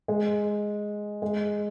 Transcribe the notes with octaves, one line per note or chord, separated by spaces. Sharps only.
G#3
G#3